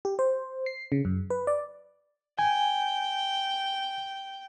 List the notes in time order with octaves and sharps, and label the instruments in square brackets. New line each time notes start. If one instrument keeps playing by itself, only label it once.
[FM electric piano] G4
C5
C7
C#3
F#2
B4
D5
[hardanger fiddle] G5 [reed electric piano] G#5